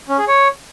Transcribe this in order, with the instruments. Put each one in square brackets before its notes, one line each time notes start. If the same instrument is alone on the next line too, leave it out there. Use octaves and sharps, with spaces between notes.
[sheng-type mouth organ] C#4
G#4
C#5